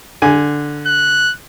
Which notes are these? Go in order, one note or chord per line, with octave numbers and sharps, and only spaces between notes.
D3 G#5
F#6